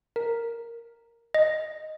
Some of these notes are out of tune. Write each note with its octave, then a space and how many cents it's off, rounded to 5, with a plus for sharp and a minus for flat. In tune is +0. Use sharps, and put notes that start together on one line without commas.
A#4 -5
D#5 -5